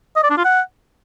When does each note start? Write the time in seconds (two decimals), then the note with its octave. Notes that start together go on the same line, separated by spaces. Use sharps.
0.16 D#5
0.23 D5
0.30 D4
0.37 F4
0.45 F#5